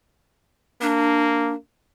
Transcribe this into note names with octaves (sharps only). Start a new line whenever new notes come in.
A#3 D4